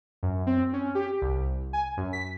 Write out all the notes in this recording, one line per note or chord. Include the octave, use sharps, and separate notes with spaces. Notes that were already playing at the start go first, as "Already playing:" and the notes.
F#2
C4
C#4
G4
C2
G#5
F#2
B6